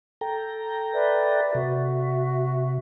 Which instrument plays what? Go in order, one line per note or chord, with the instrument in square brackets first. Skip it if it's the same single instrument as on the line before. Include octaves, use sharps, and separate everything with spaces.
[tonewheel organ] A4 G5 A#5
[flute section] B4 D5 E5
[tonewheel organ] C3 [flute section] F#4 E5